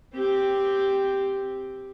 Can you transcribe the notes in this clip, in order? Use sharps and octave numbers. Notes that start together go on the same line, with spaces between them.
C4 G4